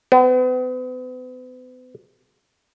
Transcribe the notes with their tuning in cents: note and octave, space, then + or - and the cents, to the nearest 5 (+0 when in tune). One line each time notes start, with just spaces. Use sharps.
B3 +40